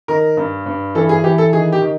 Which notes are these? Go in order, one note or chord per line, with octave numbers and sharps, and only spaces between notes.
D#3 A#4
G2
G2
E3 A4
G#4
E3 G4
A4
D#3 G#4
G4
D#3